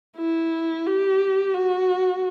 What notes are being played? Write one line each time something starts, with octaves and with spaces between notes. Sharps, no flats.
E4
G4
F#4